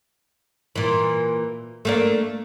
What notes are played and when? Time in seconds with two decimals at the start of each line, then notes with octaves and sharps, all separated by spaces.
0.76 A#2 E3
1.85 A3 A#3 D4